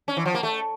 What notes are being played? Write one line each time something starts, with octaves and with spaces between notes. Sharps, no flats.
C#4
E3
F3
A#3
A3